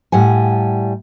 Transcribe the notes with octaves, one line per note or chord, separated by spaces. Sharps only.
A2 G3 F#5 G#5